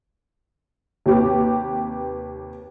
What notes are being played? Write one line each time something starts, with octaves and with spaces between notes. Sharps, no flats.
D#2 C3 G4 B4